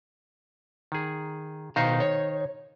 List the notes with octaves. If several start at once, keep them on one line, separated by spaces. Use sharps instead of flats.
D#3 G#4
B2 D#3 D#4 C5 F5 A#5
C#5